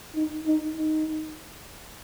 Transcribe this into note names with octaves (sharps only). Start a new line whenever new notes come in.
D#4
D#4
D#4